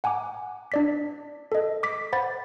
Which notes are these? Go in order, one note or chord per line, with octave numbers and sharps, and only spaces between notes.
F#5 G#5 A#5 D6
D4 D5 B6
A4 D#5
D6 B6
C5 F#5 B5 A6